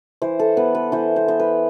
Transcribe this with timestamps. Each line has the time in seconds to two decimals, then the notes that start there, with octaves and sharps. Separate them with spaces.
0.22 E3 C5
0.39 A4
0.57 B3 B4
0.75 B4
0.92 E3 C5
1.16 C5
1.28 B3 C5
1.40 B4